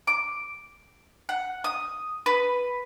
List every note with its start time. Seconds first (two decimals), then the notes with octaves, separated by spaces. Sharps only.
0.07 D6
1.29 F#5
1.64 D#6
2.26 B4